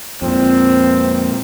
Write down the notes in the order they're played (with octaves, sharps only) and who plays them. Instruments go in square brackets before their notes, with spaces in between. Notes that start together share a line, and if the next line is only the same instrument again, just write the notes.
[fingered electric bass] F2 A#2 [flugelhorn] C4